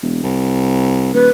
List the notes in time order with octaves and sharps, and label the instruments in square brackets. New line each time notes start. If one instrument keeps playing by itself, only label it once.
[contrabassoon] E1
C2
[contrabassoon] D#1 [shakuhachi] B4